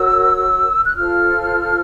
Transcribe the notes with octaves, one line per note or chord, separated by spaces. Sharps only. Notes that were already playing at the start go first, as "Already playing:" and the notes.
Already playing: F#4 A#4 C#5 E6
F#6
F4 A4 C5 F6